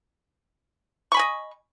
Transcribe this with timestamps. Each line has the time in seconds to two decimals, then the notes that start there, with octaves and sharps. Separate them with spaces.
1.12 C#6
1.14 B5
1.17 G#5
1.19 D#5